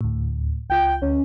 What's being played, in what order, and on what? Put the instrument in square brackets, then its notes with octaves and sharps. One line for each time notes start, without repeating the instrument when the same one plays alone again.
[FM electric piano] D2 A2
[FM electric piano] C#2 F4 G6 [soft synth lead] G5
[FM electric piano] D2 [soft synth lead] C#4